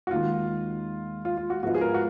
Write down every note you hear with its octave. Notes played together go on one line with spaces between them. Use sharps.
F#4
D#2 D#3 G#3 D#4 F4
F4
F4
F#4
G#2 F3 G#3 B3 F4 F#4
G#4
A#4
F#4